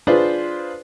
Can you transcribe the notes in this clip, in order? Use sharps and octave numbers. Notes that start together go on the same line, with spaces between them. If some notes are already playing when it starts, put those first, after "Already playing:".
D4 F4 G#4 B4 C5 D5